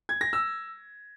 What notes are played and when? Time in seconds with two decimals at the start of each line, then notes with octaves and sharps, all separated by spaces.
0.09 G#6
0.21 A#6
0.33 E6